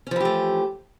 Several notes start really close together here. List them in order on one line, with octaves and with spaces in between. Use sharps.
C#4 F3 E3 G4 A3